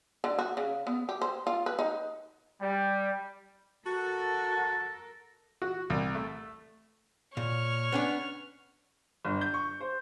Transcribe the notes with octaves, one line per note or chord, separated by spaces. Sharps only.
D3
F#4
C#3
B3
G4
C5
F4
B4
D#4
G3
F#4 A4 A#4 A5
F#4
C2
A3
A#2 C#5 F6
B3 C#4 D4
G1
G6
C#6
C5